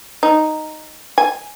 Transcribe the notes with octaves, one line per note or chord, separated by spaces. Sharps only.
D#4
G#5